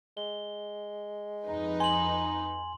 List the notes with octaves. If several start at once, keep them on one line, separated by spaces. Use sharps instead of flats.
G#3 G7
F2 D#4 B4
G#5 C6 F#7